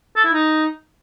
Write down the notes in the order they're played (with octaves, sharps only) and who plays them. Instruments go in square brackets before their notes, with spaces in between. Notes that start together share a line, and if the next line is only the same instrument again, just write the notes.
[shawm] A4
E4
D#4